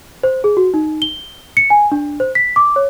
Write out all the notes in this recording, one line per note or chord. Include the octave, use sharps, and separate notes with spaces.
C5
G#4
F#4
D#4
G7
C#7
G#5
D4
C5
B6
D6
C#5